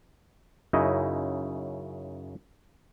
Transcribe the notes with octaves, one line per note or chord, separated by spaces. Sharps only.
F#2 C#3 D#4 E4 D#5